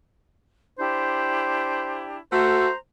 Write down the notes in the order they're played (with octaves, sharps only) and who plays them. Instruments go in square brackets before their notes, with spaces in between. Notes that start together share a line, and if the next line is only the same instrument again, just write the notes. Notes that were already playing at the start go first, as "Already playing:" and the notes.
[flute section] D4 E4 G4 [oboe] C5
[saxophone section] A3 F#4 [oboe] C5 [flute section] A#5